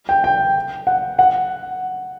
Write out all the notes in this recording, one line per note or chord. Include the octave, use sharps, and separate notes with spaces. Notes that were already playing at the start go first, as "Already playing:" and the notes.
G5
G5
F#5
F#5